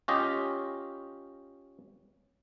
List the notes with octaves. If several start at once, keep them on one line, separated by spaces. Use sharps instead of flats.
C#4 F4 G4 D#5